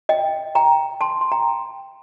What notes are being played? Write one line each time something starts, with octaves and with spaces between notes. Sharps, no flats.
D#5 G5
G5 A#5
A5 C6
C6
G5 A#5